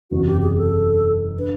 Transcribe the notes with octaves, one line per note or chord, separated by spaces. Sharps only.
F#1 E2 C3 F#4
G4
G#4
A4
D3 B4